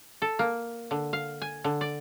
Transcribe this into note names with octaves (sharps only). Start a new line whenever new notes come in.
A4
A#3
D3
F5
G#5
D3
D5